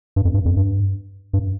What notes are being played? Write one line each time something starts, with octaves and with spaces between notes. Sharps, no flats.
G2
F2
G2
F2
G2
G2